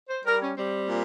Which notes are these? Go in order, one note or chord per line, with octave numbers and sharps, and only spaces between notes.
C5
G3 A#4
C#4
G3 C4
A#2